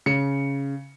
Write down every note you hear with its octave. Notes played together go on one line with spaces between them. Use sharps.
C#3 C#7